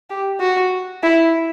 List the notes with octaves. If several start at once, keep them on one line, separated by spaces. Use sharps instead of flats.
G4
F#4
E4